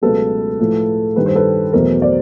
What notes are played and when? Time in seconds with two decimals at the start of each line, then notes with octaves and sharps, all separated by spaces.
0.02 C#2 B2 F#3 A3 A4 B4
0.60 A2 F3 A3
1.16 G2 D#3 G3 B4
1.26 C5
1.35 A4 B4
1.73 E2 B2 F#3 A3 A#4 C5
2.02 C5 D5